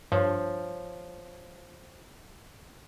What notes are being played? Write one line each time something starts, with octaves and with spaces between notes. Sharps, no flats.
G2 F3 C#5